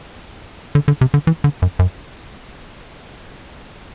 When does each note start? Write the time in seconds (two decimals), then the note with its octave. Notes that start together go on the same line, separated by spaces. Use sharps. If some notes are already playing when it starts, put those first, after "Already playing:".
0.75 D3
0.88 D3
1.01 C3
1.14 D3
1.27 E3
1.44 D3
1.62 F#2
1.79 F#2